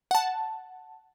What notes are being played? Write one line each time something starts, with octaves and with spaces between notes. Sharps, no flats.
F#5 A5